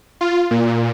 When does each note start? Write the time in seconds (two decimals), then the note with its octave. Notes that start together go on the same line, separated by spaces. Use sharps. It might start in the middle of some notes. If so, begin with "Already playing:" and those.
0.21 F4
0.51 A#2